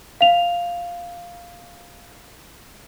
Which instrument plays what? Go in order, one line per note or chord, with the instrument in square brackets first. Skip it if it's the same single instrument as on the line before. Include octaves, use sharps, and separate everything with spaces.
[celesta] F5 F7